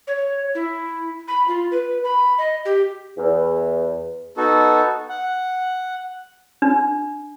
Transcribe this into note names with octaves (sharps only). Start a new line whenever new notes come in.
C#5
E4
B5
F4
B4
B5
D#5
G4
E2
B3 D#4 F#4 A4
F#5
D4